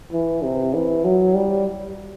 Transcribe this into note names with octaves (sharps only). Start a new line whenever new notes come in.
E3
C3
E3
F#3
G3